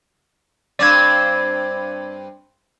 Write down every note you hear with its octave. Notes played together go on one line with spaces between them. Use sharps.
G2 C4 D5 D6 G#6